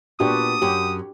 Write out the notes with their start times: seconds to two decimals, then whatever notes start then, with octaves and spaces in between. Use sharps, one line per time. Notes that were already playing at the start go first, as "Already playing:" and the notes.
0.20 A#2 B3 D4 F#4 G4 D#6
0.62 F#2 G4 C#5